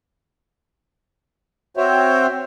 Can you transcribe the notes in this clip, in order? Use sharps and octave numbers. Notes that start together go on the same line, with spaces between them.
C4 F#4 C5 C#5 E5 G5